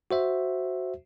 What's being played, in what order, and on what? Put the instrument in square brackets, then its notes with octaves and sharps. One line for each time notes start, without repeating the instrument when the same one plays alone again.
[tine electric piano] F#4 C5 E5